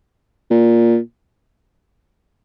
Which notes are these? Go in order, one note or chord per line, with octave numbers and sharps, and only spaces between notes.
A#2